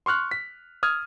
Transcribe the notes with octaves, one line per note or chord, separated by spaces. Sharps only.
C6 C#6 F6 F#6
B6
D#6 F6 G#6